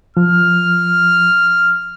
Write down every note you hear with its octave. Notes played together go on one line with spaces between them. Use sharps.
F3 F6